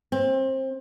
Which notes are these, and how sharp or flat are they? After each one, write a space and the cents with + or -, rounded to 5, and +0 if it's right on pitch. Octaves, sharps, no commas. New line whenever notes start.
C4 +25